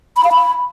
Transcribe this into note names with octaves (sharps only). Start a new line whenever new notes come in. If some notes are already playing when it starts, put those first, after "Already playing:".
B5
F5
B5